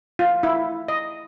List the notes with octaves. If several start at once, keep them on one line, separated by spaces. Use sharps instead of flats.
F4
E4
D#5